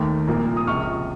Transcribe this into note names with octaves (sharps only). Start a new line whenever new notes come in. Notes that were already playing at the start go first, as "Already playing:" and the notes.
Already playing: D#2 D#3 A3
C2 A#2 F3 A#3
D#6
C#2 C3 F3 C#6 F6